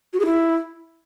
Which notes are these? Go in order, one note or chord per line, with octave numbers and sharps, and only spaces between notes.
F#4
G#4
E4